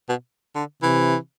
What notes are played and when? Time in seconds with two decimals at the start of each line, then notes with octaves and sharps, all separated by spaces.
0.09 B2
0.55 D3
0.82 C3 E3